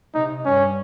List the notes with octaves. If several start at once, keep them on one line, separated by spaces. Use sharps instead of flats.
C3 D#4
G2 C#4